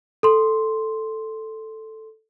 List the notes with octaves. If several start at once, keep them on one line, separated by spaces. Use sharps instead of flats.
A4 C6